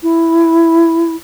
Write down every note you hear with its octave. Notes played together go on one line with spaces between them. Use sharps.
E4